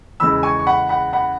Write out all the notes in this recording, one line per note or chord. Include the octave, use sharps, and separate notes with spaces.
E2 C#3 G#3 B5 E6
G#5 C#6
C#6
F#5 B5
F#5 B5
F#5 B5